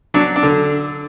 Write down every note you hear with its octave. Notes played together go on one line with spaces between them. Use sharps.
F#3 D4
D4
D3